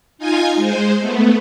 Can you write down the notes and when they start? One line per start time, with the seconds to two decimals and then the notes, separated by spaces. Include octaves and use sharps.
0.18 D#4 F4 G#5 G#6
0.55 G#3 C5
0.98 A3 B3